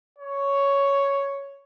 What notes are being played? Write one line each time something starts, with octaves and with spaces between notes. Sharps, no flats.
C#5